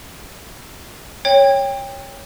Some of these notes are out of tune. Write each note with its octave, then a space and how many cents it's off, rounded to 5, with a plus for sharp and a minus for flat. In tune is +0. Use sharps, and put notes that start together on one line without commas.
C#5 +0 G5 +25